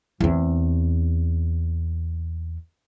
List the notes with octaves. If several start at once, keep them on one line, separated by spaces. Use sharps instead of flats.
E2 C4